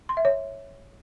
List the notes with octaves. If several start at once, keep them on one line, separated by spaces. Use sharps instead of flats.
C6
E5
C#5